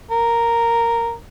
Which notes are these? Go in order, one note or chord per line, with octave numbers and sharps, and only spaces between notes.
A#4